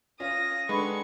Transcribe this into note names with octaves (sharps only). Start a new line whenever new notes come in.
C#4 F4 D#6 A#6
D3 D#3 G#3 B4 B5 C#6